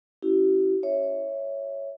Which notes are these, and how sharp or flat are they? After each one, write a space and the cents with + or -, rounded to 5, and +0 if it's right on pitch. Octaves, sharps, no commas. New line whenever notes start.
C#4 +0 E4 +0 G4 -45
C#5 +0 E5 -5